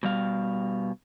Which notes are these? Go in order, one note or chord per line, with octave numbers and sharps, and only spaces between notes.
B2 G3 F5